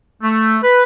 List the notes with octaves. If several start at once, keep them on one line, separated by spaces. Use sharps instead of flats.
A3
B4